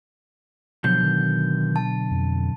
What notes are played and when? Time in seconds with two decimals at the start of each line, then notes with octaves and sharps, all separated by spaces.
0.84 B2 D3 F3 F#3 G6
1.03 D#3
1.76 A5
2.11 F2